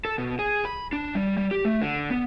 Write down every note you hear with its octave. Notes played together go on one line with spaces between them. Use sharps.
A4
B2
G#4
B5
D4
G3
G3
G4
A3
D3
B3